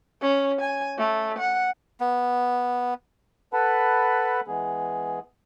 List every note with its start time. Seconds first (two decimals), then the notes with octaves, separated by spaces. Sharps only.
0.21 C#4
0.61 G#5
0.98 A3
1.39 F#5
2.00 B3
3.53 A4 B4 F#5 A5 B5
4.48 E3 G#3 B3 G#4